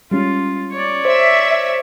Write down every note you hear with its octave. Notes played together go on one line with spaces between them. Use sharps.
G3 G#3 C#4 F4
C#5 D5
C5 E5